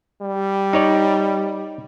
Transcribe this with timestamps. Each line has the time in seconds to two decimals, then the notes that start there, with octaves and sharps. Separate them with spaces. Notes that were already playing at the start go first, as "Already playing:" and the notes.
0.21 G3
0.73 D#4 C#5 D5